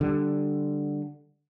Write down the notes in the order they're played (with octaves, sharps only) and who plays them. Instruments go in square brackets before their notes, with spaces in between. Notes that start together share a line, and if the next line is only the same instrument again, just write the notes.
[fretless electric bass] D3 G3